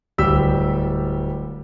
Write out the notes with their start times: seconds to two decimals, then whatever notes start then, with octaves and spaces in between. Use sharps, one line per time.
0.18 D1 G3 G4 E6 B6